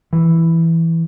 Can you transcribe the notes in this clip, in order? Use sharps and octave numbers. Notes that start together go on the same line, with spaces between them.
E3